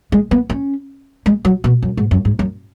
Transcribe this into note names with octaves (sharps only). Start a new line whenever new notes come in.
G#3
B3
C#4
G#3
F#3
B2
F#2
G#2
F#2
G#2
F#2